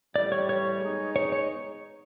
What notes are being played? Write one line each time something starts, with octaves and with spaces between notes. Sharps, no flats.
A2 E3 G3 D5
C#5
C#5
G#3 B3 D#4
C#5
C#5